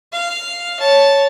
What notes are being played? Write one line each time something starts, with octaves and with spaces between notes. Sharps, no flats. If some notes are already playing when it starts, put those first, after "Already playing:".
F5
C#5 A5